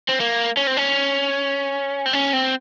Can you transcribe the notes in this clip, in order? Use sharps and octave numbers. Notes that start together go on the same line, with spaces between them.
C4
A#3
C#4
C4
C#4
C4
C#4
C4